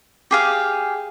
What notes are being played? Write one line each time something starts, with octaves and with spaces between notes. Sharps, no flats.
G4 G#4 F5